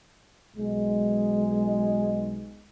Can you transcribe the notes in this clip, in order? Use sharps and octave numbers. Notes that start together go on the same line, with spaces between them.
B1 G#3